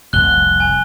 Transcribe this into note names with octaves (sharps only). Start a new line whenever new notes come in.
F1 C2 F#6 G7
G#5